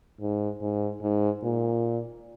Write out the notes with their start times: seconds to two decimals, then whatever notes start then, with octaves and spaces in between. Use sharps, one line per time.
0.21 G#2
0.61 G#2
1.01 G#2
1.43 A#2